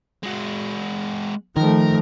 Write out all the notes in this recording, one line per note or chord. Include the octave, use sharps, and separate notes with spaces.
G#3 F#4
D#3 F3 A3 A#4